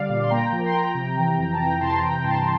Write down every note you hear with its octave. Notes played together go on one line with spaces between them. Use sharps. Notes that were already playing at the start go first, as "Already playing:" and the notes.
Already playing: D3 G3 D5 F5
A#2
C6
A#3 G5 A#5
F3
C6
F3 G5 A#5
C3
E3
F2
A5
E3 G5 A#5
C3 A5 C6
E3 G5 A#5
G2 A5 C6